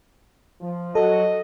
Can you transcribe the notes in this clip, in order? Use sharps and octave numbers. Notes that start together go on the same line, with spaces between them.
F3
F#3 F#4 A4 D#5